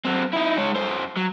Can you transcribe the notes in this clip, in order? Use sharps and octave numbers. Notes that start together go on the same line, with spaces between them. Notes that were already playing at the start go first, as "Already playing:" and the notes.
F#3 C4
D#4 E4
G#3 C#5
F#2 C5
F#3